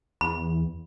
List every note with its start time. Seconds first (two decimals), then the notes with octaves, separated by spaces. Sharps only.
0.21 E2 B5